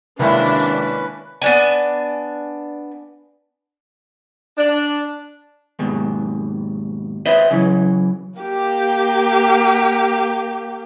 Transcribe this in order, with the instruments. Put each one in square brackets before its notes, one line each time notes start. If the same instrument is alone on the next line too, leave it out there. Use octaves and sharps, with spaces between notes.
[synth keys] C3 D#3 G#3 [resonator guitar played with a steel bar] A#3 E4 [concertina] C#4 B4 [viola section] D4
[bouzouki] B3 D4 G#5
[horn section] D4
[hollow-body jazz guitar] D#2 G#2 B2
B4 C5 D#5 E5
C#3 E3 F#3
[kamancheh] A#3 G4